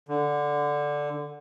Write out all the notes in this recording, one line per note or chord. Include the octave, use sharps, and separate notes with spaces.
D3